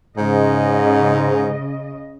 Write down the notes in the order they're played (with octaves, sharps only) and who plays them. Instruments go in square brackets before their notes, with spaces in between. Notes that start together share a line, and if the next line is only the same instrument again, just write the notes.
[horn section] G#2 [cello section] C#3 D#5